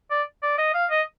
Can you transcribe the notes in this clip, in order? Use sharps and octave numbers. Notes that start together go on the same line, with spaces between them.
D5
D5
D#5
F5
D#5